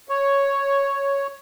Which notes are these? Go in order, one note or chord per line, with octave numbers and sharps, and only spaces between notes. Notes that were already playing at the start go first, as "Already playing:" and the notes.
C#5